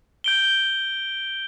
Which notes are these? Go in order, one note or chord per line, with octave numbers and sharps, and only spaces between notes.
G6 D7 G7